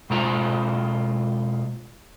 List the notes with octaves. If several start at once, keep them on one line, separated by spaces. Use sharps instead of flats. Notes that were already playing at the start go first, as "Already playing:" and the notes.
B2 G#3 F4 C5 A#5